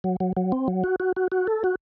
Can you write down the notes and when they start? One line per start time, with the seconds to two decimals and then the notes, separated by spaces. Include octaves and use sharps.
0.04 F#3
0.20 F#3
0.37 F#3
0.52 C4
0.68 F#3
0.84 F#4
1.00 F#4
1.16 F#4
1.32 F#4
1.47 A4
1.64 F#4